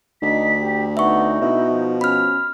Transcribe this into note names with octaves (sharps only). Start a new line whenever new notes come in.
D2 D#4 B6
G4
B3 D#4 E5 C#6
B2 E4
F3
C#4 B5 F6